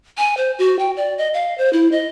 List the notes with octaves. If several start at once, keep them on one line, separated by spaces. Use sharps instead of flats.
G#5
C5
F#4
G5
D5
D#5
F5
C5
E4
D#5